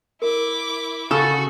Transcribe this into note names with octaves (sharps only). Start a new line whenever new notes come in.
E4 A#4 D6
C#3 F#4 A4